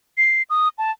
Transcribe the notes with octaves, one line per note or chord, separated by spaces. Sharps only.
C7
D#6
A5